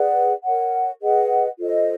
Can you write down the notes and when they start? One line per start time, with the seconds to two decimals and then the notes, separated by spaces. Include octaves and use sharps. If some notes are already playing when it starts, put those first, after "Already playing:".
Already playing: G#4 B4 D5 F#5
0.44 A#4 C#5 F#5
1.02 G#4 B4 D#5 F#5
1.59 F4 A4 C5 D#5